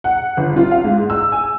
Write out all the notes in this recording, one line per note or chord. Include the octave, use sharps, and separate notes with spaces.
F#5
G1
F4
F5
G#2
E6
G#5